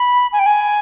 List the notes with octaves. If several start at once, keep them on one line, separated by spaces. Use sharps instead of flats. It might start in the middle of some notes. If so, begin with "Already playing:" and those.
Already playing: B5
G#5
G5
G#5